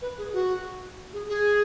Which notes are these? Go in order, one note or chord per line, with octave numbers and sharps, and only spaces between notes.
B4
G#4
F#4
G#4
G#4